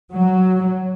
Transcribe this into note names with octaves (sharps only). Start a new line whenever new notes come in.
F#3